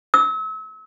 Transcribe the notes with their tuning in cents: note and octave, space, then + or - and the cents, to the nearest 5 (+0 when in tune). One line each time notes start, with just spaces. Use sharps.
E6 -40